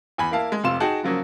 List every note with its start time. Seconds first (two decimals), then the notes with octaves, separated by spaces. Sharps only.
0.18 E2 G#5 B5
0.31 A#3 E4 F5 A5
0.52 G#3
0.64 F1 C3 F4 C6 E7
0.80 D#4 F#4 G#4 G5 A5
1.03 C#3 F3 F#3 A#3 F#4